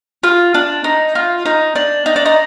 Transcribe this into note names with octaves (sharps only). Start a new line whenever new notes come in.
F4
D4
D#4
F4
D#4
D4
D#4
D4
D#4